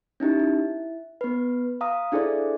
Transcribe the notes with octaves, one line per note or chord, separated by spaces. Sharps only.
C#4 D#4 E4 G4
E4
B3 B4
F5 A#5 D#6
D4 E4 G#4 A4 C5 D5